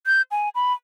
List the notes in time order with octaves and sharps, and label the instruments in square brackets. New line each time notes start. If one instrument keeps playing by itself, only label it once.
[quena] G6
G#5
B5